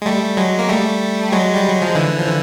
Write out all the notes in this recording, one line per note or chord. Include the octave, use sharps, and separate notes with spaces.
G#3
G3 A3
F#3 G#3
A#3
G3 A3
F#3 G#3
G3
F#3
F3
D3 E3
F3
D3 E3